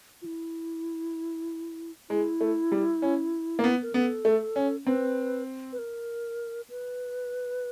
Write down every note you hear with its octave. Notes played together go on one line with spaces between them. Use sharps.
F4
E4
G#3 E4
A3
G3
C#4
A#3
B3
A#4
B3 A4
A3
C#4
C4 B4
B4
A#4
B4